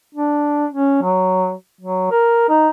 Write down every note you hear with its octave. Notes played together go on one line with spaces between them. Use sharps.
D4
C#4
F#3
F#3
A#4
D#4